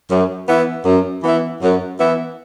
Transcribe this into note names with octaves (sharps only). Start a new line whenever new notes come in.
F#2
E3 B3 E4
F#2
E3 B3 E4
F#2
E3 B3 E4